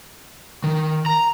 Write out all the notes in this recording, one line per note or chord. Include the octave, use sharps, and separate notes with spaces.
D#3
A#5